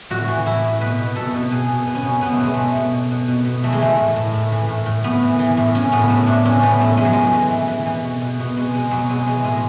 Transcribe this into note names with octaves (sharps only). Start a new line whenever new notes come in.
A2 F#4
E3
A2 E4
A2
B2 B4
B2
B2 A4
B2
B2 G#4
B2
B2 B3
C#4
B2 B3
B2 B3
A3
B2 G#3
B2 A3
B2
B2
B2
B2
B2
E3 A3
G#3
E3 A3
A2
A2
A2
E3
A2
A2
A2 B3
E3
E3
A2
A2 C#4
A2 B3
A2 A3
A2 D4
A2 C#4
E3 B3
A2 A3
A2 G#3
F#3
A2 G#3
E3
E3
E3
B2
B2
B2
B2
B2 G#3
B2 G#3
B2 F#3
B2 G#3
E3 G#3
A2 G#3